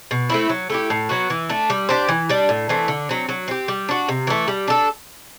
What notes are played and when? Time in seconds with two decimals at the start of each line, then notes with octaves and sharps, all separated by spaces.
0.11 B2
0.30 A3 C4 E4
0.49 F#3
0.70 A3 E4 G4
0.90 A2
1.09 F#3 B3 F#4
1.30 E3
1.49 A3 D4
1.70 G3
1.89 D4 G4 C5
2.08 E3
2.29 G3 D4
2.49 A2
2.69 E3 A3 C4
2.88 D3
3.09 F#3 C4
3.29 F#3
3.48 C4 G4
3.68 G3
3.89 D4 F#4
4.08 C3
4.27 E3 A3
4.48 G3
4.68 D4 A4